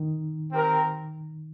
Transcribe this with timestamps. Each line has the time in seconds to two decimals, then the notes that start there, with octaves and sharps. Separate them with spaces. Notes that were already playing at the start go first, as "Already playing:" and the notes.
Already playing: D#3
0.53 C4 G4 A#4